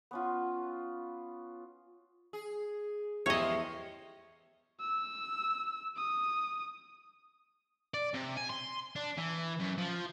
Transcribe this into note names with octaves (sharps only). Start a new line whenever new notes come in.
B3 C#4 F4
G#4
E2 F3 G#3 G4 C#5 D#5 E5
E6
D#6
D5
C3
G#5
C6
D4
E3
F#2
F3